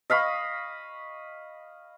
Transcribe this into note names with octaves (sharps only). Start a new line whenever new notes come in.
D#5 F5 B5 C#6